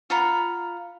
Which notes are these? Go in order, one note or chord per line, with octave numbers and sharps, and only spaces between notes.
F4 F#5 A#5 B5